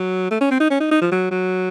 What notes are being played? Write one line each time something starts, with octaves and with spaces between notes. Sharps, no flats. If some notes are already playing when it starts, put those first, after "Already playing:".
Already playing: F#3
A3
C#4
C4
D#4
C#4
D#4
D#4
F3
F#3
F#3